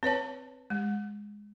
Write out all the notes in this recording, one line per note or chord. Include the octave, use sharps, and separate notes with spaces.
C4 B4 C#5 A5
G#3